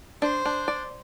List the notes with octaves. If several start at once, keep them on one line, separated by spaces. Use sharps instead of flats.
D4 C5
D4
D5